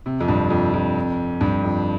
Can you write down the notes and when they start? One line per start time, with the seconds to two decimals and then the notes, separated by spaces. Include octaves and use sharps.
0.06 C3
0.20 F2
0.28 G2
0.50 F2
0.74 F2
1.41 G2
1.64 F2